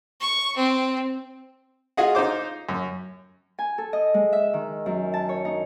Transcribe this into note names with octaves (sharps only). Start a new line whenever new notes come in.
C#6
C4
F4 F#4 G#4 D#5 F#5
D#4 F4 C5 D6
F#2
G#5
A4
D#5
G#3
E5
D#3
F#2
A5
C#5
D#4